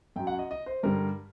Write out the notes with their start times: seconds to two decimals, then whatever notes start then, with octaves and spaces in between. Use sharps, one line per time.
0.16 F#2 G5
0.20 F#3
0.27 F#5
0.39 D#5
0.51 D#5
0.66 C5
0.83 G2 D3 G3 A#4